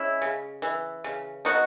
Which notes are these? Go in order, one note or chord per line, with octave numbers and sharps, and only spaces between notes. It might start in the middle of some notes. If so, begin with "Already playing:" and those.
Already playing: G#3 C#4 E4
C#3
E3
C#3
B3 D#4 F#4